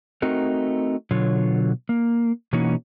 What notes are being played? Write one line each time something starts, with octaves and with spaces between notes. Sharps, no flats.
A3 C4 D#4 F#4 A#4
B2 D3 F#3 F4 C#5
A#3
B2 E3 A#3 C#4 D#4 F#4